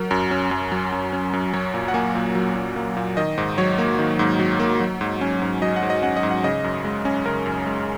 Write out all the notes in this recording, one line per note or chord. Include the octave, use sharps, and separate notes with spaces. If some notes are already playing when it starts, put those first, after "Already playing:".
Already playing: F#3 A#4
F#2
C#4
F#2
F#3
F#2
C#4
F#2
F#3 C#5
A#2
F#5
A#3 G#5
A#2
F#3
A#2
A#3
A#2
D#3 D#5
G#2
F#3 C#5
A#3
D#3
G#2
F#3
A#3
F#3
G#2
C#4
G#2
F#3 D#5
F#5
G#2
D#5
C#4 F#5
D#5
G#2
F#5
C#3 D#5
F#2
G#3
C#4
C#3 A#4
F#2
G#3